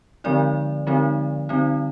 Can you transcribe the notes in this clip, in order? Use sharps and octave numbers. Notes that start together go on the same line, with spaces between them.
D3 F3 G#3 C4 D#4 D5
D3 F3 G#3 C4 D#4
D3 G3 C4 D#4